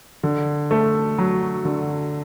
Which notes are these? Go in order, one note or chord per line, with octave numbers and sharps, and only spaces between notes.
D3
A3
F#3
D3